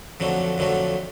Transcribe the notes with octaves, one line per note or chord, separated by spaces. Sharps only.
F2 D3 F#3 A3
F2 D3 F#3 A3